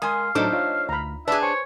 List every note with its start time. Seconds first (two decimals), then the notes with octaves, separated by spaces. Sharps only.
0.02 G#3 A#4 F5 G#5 C6 D#6
0.35 A2 F#3 A3 D4 D#4 A4 C5 D6
0.53 F4 C#5 D#5
0.89 D2 A#5 B5
1.28 D4 G#4 B4 D5 E5 F#6
1.42 C5 C#5 G#5